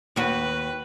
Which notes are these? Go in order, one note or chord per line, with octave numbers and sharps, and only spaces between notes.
D#2 F#4 B4